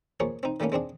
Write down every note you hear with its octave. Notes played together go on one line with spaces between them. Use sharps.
F3 A#3 G#4 C#5
C4 D#4
D#3 G3 A3 A#3 C#4
G#3 C4 D4 G#4